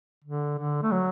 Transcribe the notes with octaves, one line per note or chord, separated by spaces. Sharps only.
D3
D3
A3
F#3